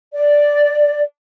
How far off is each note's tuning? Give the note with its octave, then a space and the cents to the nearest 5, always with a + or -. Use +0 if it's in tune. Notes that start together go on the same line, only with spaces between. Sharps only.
D5 +0